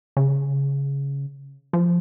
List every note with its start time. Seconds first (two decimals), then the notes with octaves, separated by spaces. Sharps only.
0.17 C#3
1.73 F3